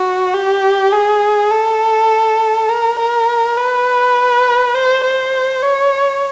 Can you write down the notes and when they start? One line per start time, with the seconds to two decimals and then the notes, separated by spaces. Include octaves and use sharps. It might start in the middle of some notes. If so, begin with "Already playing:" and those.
Already playing: F#4
0.34 G4
0.92 G#4
1.51 A4
2.69 A#4
2.98 A#4
3.57 B4
4.74 C5
5.04 C5
5.63 C#5